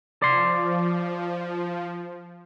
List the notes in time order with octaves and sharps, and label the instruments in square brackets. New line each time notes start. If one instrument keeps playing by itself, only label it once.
[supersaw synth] F3 [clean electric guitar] D5 C6